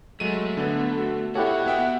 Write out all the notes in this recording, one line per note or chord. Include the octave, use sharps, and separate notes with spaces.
F#3 G#3 A3 D#7
D3 B3
F#4
B2 E4 F#4 G4 A4 C#5 F#5
B3 E5 G5